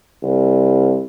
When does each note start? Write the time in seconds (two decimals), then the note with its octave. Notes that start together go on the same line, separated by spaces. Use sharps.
0.23 C2